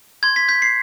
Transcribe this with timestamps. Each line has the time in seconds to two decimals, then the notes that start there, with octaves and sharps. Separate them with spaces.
0.23 C6 G#6
0.36 B6
0.48 G6 B6
0.62 C7